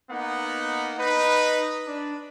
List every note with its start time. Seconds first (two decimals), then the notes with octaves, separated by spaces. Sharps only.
0.10 A#3 B3 D#4 F#5
0.99 D#4 B4
1.86 D4